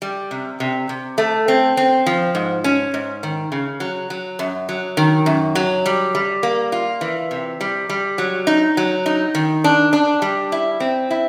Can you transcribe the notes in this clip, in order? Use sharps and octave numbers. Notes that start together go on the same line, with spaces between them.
G3
C3
C3
C3
A3
C4
C4
F3
G#2
C#4
G#2
D#3
C#3
F#3
F#3
F#2
F#3
D#3
F#2
F#3
G3
G3
A#3
F4
E3
C3
G3
G3
F#3
D#4
F#3
D#4
D#3
D4
D4
G3
E4
C4
E4